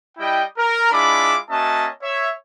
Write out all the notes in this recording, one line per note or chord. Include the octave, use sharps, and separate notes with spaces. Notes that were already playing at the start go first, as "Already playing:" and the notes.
G3 E4 D#5 G5
A#4
G#3 D4 E4 F4 B5 D6
A#3 C#4 F#4 D#5 E5 A5
C#5 E5